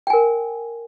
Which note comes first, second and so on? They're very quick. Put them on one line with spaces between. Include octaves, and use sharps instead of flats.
G5 G#5 A#4